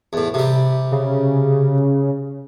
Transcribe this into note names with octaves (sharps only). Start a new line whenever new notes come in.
E2 A2
C3 G3
C#3